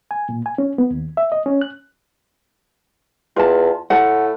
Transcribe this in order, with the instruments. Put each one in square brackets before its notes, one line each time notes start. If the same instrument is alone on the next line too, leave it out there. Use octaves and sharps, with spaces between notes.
[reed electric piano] G#5
A#2
G#5
C#4
B3
D#2
E5
D#5
C#4
F#6
[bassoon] E2 [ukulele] F4 A5
[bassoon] A2 [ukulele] F#5 A5